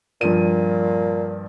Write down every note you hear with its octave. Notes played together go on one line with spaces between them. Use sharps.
G2 A#2 F3 D#7